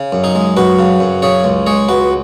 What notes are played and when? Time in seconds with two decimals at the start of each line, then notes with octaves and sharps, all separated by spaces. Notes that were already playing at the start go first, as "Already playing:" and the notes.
Already playing: C#3
0.12 F#2
0.24 D#4 G#4
0.35 G#3
0.57 F#2 F#4 B4
0.79 C#3
1.00 F#2
1.22 C#3 G#4 C#5
1.44 C#2
1.66 G#3 G#4 C#5
1.89 C#2 F#4 B4